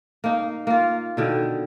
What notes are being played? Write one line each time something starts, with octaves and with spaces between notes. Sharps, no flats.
A#3 D#4
A#3 F4
B2 D3 D#3